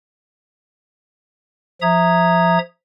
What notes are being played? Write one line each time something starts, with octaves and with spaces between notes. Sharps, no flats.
F3 E5 A#5 D#6 G#6